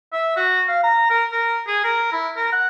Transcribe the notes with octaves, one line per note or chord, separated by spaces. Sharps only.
E5
F#4
F5
A#5
A#4
A#4
G#4
A#4
E4
A#4
F#5